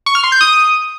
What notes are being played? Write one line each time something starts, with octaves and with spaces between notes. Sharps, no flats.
C#6
F6
C6
G6
D#6